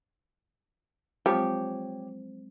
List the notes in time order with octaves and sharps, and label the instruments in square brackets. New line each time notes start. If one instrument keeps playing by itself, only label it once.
[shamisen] F3 [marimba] F#3 G#3 C4 [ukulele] G4 C#5 G5